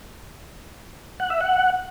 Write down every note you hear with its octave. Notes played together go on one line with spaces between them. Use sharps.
F#5
E5
F#5